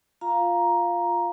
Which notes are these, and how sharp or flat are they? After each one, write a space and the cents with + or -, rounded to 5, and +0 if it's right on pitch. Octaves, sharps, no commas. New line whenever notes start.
F4 +0 F5 +0 A#5 +10